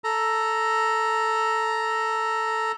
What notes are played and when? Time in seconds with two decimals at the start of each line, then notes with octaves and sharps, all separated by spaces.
0.04 A4 A#5